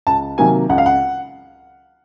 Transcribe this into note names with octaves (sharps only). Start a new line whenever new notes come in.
C#2 A5
C3 D#3 F#3 A#3 G#5
C#2 F#5
F5
F#5